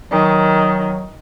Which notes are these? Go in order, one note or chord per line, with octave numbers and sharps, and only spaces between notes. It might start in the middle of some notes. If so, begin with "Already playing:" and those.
D#3 F#3